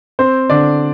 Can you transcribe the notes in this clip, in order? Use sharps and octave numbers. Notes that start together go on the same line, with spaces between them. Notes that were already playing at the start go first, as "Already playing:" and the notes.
C4 C5
D3 D4 D5